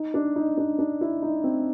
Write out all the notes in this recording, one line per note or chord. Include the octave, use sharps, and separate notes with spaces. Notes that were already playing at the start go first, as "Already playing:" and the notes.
Already playing: D#4
D4
D#4
D4
D4
E4
D#4
C4